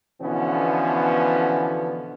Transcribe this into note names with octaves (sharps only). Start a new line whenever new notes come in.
B2 D3 E3 F3 B3 C#4